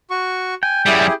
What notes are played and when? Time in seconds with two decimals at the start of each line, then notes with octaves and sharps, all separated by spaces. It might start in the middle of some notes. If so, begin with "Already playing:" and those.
0.10 F#4 C#6
0.63 G5 G#5
0.86 F#2 G3 E4 G4 G#4